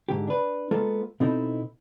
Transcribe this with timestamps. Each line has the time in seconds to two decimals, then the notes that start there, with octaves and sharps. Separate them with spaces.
0.09 G#2 D3 G4
0.27 D4 B4
0.71 G#3 A#3 B3 F4 A4
1.20 B2 C4 D#4 E4 A4